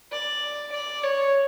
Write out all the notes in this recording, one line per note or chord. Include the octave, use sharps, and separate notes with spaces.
D5
D5
C#5